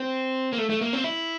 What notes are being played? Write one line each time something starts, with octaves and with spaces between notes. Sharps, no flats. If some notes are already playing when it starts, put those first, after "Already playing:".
Already playing: C4
A#3
A3
A3
A#3
C4
E4